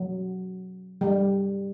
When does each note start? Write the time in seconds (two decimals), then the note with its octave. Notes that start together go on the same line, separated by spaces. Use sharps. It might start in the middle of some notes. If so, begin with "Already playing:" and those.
Already playing: F#3
1.01 G3